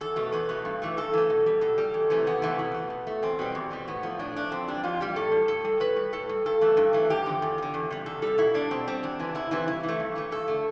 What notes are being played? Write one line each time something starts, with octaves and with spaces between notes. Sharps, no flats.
E2 A4
B2 A3
E2 B4
B2 A3
G2
E3 A3
G2 A4
E3 A3
B2
G3
B2 A4
G3
E2
C3 E3 A3
E2 B3
C3 E3 A3
B2
A3
B2
A3
E2 C4
B2 G3
E2
B2 G3
A2 B3
F3 A3
A2 D4
F3 A3 D4
F2 C4
E3 G3 D4
F2 F4
E3 G3 G4
A2 A4
G3
A2 A4
G3
A2 B4
G3
A2 A4
G3
G2 A4
E3 A3
G2
E3 A3
E2 G4
D3 F3
E2
F3
D3
E2
C3 G3
E2 A4
C3 G3 A4
B2 E4
G3 D4
B2 C4
G3 C4
E2 D4
C3 E3
E2 E4
C3 E3 E4
G2 E4
E3
A3
G2
E3 A3
G2 A4
D3 A3